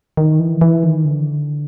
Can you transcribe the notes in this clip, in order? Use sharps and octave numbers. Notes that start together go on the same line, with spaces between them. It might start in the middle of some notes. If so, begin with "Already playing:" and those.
D#3
E3
E3
D#3
D3